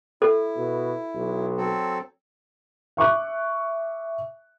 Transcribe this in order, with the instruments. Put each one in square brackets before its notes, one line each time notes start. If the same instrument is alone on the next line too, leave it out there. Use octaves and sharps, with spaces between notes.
[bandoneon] E4 [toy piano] A4
[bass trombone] B2
B1
[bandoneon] F#3 C4 A4
[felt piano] E5 C#6 D6 F#6